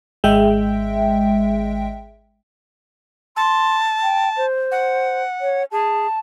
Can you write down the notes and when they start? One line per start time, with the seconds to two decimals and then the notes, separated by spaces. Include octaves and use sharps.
0.24 G#1 G#3 E5 G5
3.37 A5 C6
4.03 G5
4.37 C5
4.71 F#5
5.41 C#5
5.72 G#4 A5